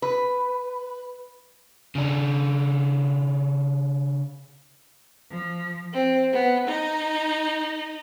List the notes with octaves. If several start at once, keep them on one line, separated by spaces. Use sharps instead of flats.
B4
C#3 D4
F3
C4
B3
D#4